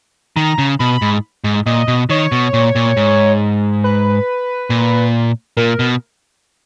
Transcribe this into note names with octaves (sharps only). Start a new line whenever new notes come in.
D#3 A#5
C#3
B2 B5
G#2
G#2
A#2 D#5
B2
D#3 C#5
B2
A#2
A#2
G#2
B4
A#2
A#2 A#4
B2